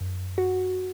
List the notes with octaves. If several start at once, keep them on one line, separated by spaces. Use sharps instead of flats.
F#2
F#4